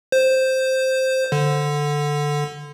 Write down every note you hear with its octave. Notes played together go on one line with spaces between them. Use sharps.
C5
D3